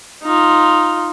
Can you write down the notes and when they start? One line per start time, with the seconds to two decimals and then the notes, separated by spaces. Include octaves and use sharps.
0.23 D#4 F4